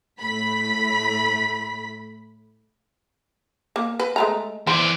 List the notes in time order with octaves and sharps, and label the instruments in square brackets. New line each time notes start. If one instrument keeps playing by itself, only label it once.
[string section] A2 A3 B5 B6
[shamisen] A#3
B4
G#3 A3 A#5
[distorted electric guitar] E3 D5 [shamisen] C5